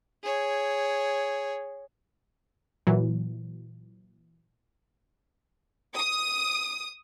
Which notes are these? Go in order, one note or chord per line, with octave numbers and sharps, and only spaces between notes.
G#4 C#5
A#2 E3 F#3
D#6